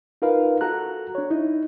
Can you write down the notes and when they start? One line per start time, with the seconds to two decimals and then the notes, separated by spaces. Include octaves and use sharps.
0.22 D#4 F4 A#4 B4 F5
0.61 F#4 A4 A#5 F#6
1.15 D4 C#5
1.30 D#4 E4